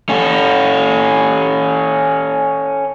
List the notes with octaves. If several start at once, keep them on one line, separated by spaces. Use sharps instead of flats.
C#4 A4